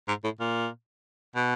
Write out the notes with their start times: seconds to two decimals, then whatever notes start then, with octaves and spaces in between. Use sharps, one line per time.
0.08 G#2
0.24 A2
0.40 A#2
1.36 B2